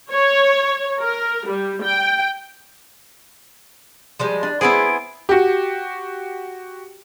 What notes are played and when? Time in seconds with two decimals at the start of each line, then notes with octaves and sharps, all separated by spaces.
0.11 C#5
1.00 A#4
1.47 G3
1.83 G5
4.19 F3 G3 G#3
4.43 D4
4.61 F#3 G#3 B3 C4 E4 G#4 C5 D7
5.29 F#4 G4